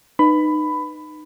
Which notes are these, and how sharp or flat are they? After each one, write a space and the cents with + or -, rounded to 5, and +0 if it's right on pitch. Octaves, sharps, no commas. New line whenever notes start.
D#4 -25 B4 +0 B5 +15